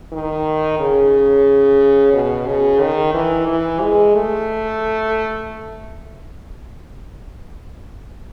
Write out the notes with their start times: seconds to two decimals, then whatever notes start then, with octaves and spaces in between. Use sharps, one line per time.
0.12 D#3
0.79 C#3
2.13 B2
2.47 C#3
2.80 D#3
3.14 E3
3.47 E3
3.81 G#3
4.14 A3